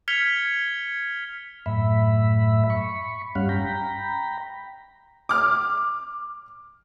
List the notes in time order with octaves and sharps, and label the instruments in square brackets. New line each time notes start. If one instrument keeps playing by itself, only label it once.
[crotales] F6 G#6 B6 C#7 F7 G7
[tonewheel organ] F#2 A2 E5 B5
B5 C#6
G2 G3 C#4 F5 F#5
G5 A#5 B5
[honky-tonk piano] D6 F6